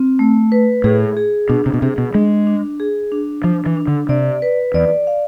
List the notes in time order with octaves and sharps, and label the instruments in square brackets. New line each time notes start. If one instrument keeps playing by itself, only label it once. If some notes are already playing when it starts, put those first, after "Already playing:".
Already playing: [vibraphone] C4
A3
B4
[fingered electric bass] A2 [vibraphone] G#4
[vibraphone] G#4
[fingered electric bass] B2 [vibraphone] D4
[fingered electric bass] C3
B2
[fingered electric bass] C3 [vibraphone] G#4
[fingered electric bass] B2
[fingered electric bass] G#3 [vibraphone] D4
[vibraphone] D4
G#4
D4
[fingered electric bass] F3 [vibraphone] D4
[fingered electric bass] E3
[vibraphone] D4
[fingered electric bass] D3
[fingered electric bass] C3 [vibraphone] D5
[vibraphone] B4
[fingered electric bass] E2 [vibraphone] D5
[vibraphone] F5